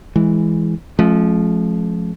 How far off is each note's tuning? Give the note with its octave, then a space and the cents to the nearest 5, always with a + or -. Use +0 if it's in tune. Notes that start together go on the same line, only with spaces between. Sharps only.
E3 +0 G#3 +0
F3 +0 G#3 +45 C#4 -40